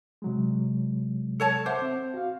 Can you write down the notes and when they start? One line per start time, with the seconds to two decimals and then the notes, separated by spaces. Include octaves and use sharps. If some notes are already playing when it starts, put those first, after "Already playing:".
0.22 C3 F#3 G#3
1.40 A4 C#5 A5
1.66 C5 E5 F#5 D6
1.82 C4
2.14 F#4 F5